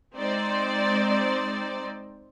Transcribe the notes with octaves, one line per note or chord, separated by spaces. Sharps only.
G#3 C4 D#4 C5 D5